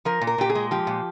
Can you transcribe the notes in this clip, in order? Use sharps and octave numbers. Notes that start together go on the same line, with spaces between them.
F3 A#4
A#2
A#4
A#2 G4
G#4
G#3
F3 G4
A#2